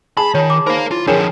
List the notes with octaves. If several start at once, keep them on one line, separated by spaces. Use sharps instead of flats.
G#4 A5 B5
D#3 F4 C#5
D6
D#4 A#4 C5 F5 B5
E4 F4
D3 F3 G#4 A#4 C#5 G5 A#5